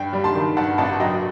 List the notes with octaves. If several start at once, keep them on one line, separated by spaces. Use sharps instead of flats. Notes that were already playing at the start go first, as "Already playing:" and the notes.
Already playing: G2 G5
G3
A5 C6
D#3
G2 F#5 A5
A1 F#5 A5
F#3 D#5 G5